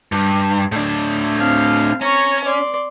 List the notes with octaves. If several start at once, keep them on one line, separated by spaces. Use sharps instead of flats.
G2
A2 D4
C4 F5
C#4 A#5 C#6
D5 C6